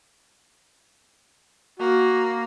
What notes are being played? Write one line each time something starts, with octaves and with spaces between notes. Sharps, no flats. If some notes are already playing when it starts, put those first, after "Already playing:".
A#3 F#4